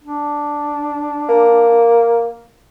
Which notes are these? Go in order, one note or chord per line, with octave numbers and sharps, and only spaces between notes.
D4
A#3